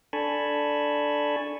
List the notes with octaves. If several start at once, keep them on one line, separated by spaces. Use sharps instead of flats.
D4 A4 G#5 A5 B5 C#6